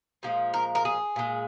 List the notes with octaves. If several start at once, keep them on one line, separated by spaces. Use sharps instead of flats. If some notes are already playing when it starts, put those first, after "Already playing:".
A#2 F3 G#3
A#4
A#4
G#4
A#2 G#3